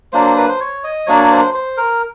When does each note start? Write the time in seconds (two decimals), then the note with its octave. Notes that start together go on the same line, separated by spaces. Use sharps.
0.13 F#3 A#3 D4 C5
0.37 B4
0.49 C5
0.60 C#5
0.84 D#5
1.07 F#3 A#3 D4 C#5
1.31 C5
1.54 C5
1.77 A#4